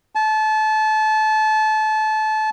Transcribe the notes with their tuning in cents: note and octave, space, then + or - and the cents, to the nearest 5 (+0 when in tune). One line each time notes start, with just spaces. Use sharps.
A5 -25